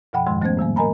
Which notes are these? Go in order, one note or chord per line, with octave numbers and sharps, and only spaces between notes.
F#2 B2 F3 F#5 G5 B5
F2 G#2 D#3 F3 G#3 C6
F3 A3 B3 C#4 C5 G#6
A2 D#3 G3 A#3
A#4 D#5 G#5 A#5 B5